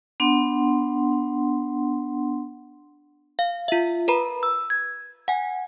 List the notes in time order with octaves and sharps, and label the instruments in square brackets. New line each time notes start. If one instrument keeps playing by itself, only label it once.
[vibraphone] B3 D4 F#5 C6
[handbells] F5
F4 E5
A#4 B4 A#5 B5
E6
G#6
F#5 G#5